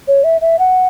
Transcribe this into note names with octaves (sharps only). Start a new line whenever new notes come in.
C#5
E5
E5
F#5